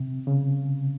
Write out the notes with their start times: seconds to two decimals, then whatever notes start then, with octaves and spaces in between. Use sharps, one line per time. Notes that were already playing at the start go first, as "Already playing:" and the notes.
Already playing: C3
0.27 C#3